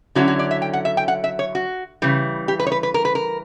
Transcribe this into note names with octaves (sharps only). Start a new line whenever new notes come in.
D3 F#3 C#4 E4 F#4
F#4
D5
E5
G5
F#5
E5
G5
F#5
E5
C#5
F#4
C#3 E3 G3
G4
B4
C#5
B4
B4
A#4
B4
A#4